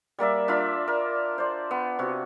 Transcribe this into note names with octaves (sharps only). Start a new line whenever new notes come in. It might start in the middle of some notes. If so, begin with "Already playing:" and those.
G3 A#3 D5 E5
D4 F4 E5 B5
A#4
C5 D5
B3
C3 F#4